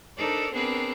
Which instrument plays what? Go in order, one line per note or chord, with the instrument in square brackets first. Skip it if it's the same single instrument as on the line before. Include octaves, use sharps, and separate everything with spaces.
[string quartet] D4 D#4 A4 A#4 C5 D5
B3 C4 D4 G#4 A#4 B4